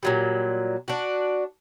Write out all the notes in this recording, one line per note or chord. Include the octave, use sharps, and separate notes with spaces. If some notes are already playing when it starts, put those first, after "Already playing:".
A#2 F#3 G3
D4 F#4